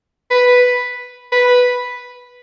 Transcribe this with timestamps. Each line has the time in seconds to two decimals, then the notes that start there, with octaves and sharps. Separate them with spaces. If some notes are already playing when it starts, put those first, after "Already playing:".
0.31 B4
1.32 B4